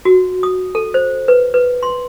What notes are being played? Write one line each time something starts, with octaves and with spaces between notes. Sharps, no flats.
F#4
D#6
A4
C5
B4
B4
C6